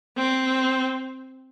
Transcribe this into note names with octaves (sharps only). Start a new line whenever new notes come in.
C4